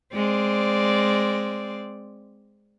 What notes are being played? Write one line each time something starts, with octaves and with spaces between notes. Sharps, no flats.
G#3 C4 D5